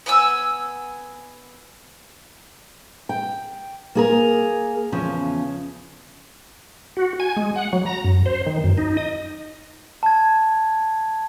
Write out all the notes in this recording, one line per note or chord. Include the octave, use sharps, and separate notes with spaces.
B3 F#5 G#5 E6
G5
A#3 G#4 A#4
E2 C#3 F3 C#4
F#4
G#5
G#3
F#5
F#3
A#5
F#2
C5
D#3
F#2
D#4
D#5
A5 G#6